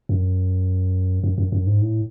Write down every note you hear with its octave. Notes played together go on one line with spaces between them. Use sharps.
F#2
F#2
F#2
F#2
G#2
A2